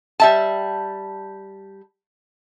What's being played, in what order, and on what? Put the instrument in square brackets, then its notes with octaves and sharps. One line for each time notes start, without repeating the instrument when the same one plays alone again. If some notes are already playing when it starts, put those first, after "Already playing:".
[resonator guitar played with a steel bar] G3 E5 A5